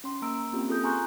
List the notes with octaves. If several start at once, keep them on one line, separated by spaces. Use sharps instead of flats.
C#4 C6
A#3 A#5 E6 D7
A#3 C4 C#4 F4 G4
F4 G#4 A4 D#6 G6
G#5 A#5 C6 C#6 F#6 G6